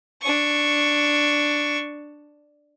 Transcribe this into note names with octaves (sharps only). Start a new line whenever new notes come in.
D4 C#6